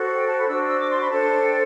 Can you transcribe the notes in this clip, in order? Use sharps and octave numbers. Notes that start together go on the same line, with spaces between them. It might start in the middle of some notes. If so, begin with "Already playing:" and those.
Already playing: F#4 A4 C5
G5
A5
B5
D4 F#4 C5 E6
E6
D6
C6
B5
D4 A4 C5 A5
G5